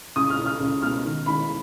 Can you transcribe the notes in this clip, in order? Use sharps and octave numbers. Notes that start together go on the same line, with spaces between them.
C#2 D#6
F6
C#2
F6
C#2
B2 F6
D#3
D#3 B5